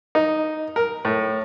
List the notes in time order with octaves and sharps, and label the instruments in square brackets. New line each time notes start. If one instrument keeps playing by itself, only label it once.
[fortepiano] D#4
A#4
A2